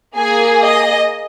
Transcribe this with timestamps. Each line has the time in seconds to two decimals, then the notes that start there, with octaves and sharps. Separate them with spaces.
0.16 A#3 G#4 G#5
0.63 D#5